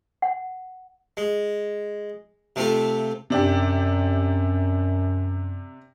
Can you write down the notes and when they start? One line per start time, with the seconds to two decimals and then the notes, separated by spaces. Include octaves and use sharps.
0.22 F#5
1.17 G#3
2.56 C3 A3 C4 F4 A4
3.30 F#2 C3 D4 G4